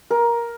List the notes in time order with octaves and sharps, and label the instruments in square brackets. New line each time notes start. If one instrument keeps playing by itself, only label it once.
[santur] A#4